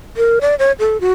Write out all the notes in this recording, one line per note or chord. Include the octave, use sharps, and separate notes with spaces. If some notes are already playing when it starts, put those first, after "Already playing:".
A#4
D5
C#5
A4
F#4